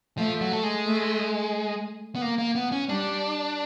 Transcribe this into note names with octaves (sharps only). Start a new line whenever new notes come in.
F3 A3
F#3
A3
G#3
A3
B3
A#3
A#3
B3
C#4
G3 D4